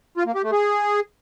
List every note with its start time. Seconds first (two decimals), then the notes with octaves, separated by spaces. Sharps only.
0.17 F4
0.26 A#3
0.35 G4
0.44 A3
0.52 G#4